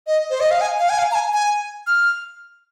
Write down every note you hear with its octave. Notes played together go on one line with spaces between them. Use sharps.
D#5
C5
D#5
F5
G#5
F5
G#5
F5
A#5
G#5
G#5
F6